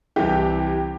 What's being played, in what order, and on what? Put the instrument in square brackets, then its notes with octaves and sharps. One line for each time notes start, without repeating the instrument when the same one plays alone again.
[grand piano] C2 C3 E3 [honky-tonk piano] G4